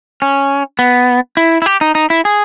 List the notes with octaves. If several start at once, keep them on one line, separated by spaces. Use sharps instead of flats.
C#4
B3
E4
E4
G4
D#4
D#4
E4
G#4